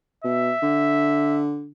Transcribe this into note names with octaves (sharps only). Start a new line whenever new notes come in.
B2 E5
D3